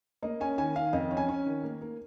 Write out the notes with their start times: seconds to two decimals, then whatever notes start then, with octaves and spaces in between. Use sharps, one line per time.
0.23 A#3 D#5
0.40 C#4 G#5
0.58 D#3 G#5
0.75 D#3 F5
0.93 F2 D#5
1.11 C#4
1.17 G#5
1.28 C#4
1.46 D#3
1.63 A#3
1.81 A#3